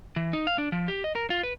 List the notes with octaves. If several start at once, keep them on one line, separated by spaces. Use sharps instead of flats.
E3
D#4
F5
D4
F3
G4
D#5
A#4
F4
B4